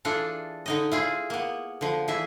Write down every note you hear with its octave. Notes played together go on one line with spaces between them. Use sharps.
E3 D4 F4 G#4 A4
D3 D#4 D#5
E4 F4 G#4
A#3 B3
D3 F3
E3 G#4 E5